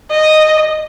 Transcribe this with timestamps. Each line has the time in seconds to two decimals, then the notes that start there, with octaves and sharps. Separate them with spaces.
0.11 D#5